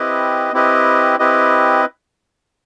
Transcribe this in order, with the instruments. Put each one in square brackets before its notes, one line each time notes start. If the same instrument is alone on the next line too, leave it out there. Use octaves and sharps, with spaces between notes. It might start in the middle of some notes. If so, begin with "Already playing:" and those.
Already playing: [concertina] C4 E4 G4 B4 D#5
C4 E4 G4 B4 D#5
C4 E4 G4 B4 D#5